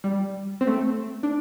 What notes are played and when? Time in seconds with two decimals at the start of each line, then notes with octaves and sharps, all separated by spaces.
0.04 G3
0.61 C4
0.67 A3
1.23 D4